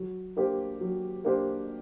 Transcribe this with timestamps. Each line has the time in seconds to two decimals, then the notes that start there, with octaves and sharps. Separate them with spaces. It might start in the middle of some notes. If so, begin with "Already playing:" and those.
Already playing: F#3
0.37 A#3 D4 G4 C5
0.81 F#3
1.24 A#3 D4 G4 C5